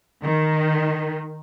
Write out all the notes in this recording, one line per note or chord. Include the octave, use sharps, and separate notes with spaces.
D#3